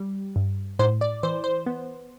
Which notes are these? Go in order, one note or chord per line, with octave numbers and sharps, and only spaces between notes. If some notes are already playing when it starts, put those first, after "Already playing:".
Already playing: G3
G2
A2 C5
D5
E3 C5
C5
B3